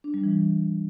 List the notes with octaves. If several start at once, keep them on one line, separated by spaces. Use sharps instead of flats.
D4
G3
E3